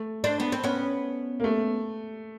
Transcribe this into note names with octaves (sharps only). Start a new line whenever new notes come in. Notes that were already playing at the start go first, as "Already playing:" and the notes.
Already playing: A3
C4 D4
B3
C4
B3 C#4
A#3
A3